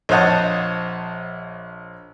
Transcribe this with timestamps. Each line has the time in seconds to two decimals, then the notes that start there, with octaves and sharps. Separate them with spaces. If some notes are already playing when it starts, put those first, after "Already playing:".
0.09 A#1 C5 C#5 D#5 F#5 A5